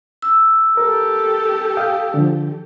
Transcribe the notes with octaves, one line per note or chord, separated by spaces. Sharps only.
E6
G4 A4 A#4
F5 G5 D#6
D3 F3